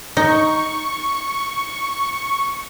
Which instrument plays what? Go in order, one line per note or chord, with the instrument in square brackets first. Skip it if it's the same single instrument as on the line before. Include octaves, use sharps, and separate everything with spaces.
[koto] D#4 [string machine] C#6